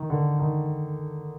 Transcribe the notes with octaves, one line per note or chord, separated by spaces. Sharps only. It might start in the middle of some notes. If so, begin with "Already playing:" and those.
Already playing: D#3
D3
D#3